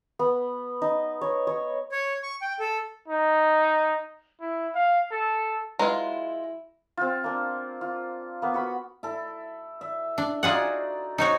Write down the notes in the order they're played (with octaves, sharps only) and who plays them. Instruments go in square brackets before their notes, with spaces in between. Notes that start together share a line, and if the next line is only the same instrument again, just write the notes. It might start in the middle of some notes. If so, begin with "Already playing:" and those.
[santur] B3
D#4
C#5
C#5
[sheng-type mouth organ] C#5
C#6
G5
A4
[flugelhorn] D#4
E4
F5
A4
[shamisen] F#3 B4 A#5 [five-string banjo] G#3 F4 [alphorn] E4
[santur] C4 F4
A#3 D4
F4
A#3 B3
F#4 F#5 B5
[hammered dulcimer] E4 A4
E5
[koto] D4
[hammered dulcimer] D#4 F#4 D5 [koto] F4 G#4 F#5
[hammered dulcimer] C4 [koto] D#4 F#4 C#5